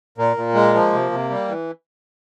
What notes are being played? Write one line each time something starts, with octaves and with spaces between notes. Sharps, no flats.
A#2 A#3
A#2
G#3
F3
C3
C3
G3
E3